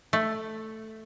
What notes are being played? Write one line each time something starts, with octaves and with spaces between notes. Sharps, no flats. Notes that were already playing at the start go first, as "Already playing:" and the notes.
A3